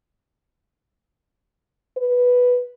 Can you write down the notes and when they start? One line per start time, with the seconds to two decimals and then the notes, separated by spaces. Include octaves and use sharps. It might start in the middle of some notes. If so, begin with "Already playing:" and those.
1.97 B4